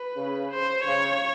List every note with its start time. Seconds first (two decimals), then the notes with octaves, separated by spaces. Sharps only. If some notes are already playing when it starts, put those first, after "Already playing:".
Already playing: B4
0.17 C#3
0.51 C5
0.86 C#3 C#5